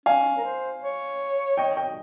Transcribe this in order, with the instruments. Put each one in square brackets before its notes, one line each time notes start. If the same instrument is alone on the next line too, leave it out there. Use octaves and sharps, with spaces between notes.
[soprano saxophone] C#4 [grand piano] F5 G#5
[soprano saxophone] A#4
C5
C#5
[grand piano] D#5 G5
D#5 G5